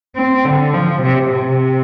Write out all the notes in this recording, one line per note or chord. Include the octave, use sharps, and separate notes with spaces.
C4
D3
F3
C3
C3